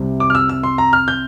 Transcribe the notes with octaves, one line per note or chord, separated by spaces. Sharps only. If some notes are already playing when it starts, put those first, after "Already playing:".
Already playing: C2 C3 G3
D6
F6
E6
E6
C6
A#5
F6
G6